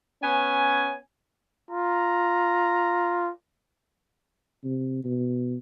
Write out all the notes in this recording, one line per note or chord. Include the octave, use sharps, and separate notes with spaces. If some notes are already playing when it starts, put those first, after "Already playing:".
B3 C#4 G#5
F4 A#5
C3
B2